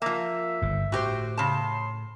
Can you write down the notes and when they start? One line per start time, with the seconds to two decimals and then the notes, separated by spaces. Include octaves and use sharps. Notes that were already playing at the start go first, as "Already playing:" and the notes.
0.02 F3 A#3 E5
0.62 G1 G#2
0.92 A2 F#4 G4 C5
1.38 C#3 A5 C6